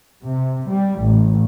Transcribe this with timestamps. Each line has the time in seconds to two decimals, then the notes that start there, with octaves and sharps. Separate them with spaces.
0.24 C3
0.69 G3
1.03 A1